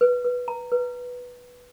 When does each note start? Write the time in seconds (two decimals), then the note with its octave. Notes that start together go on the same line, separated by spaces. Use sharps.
0.01 B4
0.24 B4
0.48 A#5
0.72 B4